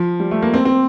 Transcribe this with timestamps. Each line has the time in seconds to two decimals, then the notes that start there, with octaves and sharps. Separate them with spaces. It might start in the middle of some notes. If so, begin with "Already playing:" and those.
Already playing: F3
0.20 G3
0.31 A3
0.42 A#3
0.54 C4
0.65 C4